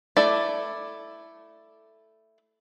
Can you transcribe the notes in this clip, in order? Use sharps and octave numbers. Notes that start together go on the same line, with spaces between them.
A3 E4 A4 D5